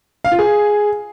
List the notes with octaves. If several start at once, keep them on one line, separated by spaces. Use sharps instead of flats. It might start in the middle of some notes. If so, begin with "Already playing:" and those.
F5
F4
G#4